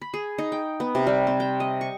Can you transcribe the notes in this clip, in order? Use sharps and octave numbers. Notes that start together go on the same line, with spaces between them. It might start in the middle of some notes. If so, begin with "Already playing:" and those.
B5
G#4
D#4
G5
B3
C3
G3
C4
G5
D#5
C#6